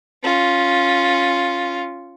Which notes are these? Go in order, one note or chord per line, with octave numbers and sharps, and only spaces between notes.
C#4 F4